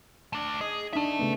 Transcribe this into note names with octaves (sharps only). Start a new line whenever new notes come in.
A3 D4
G#4 D#5
D4 D#4 E5 A5
C#3 A3 B3